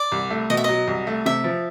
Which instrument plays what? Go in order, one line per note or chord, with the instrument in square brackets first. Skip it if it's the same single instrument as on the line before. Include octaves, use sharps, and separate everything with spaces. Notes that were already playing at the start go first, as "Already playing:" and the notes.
Already playing: [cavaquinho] D5
[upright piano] C2
A3
[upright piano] B2 [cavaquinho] D#5
[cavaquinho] E5
[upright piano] F#3 [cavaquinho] D#5
[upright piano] C2
A3
[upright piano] C3 [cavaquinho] E5
[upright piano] F3